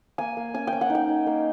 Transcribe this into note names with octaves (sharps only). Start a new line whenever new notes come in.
A#3 G#5
A#3
C#4 G#5
G5
C#4
F#5
D#4 G5
D#4
A#3